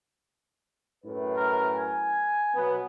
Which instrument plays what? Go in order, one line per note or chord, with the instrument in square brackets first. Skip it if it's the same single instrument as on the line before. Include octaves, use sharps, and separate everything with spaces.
[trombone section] F#2 A2 B4
[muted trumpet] A#4
G#5
[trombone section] B2 F#3 B3